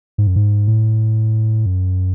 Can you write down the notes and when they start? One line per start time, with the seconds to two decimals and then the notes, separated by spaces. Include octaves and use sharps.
0.18 G#2
0.27 F#2
0.36 G#2
0.68 A2
1.66 F#2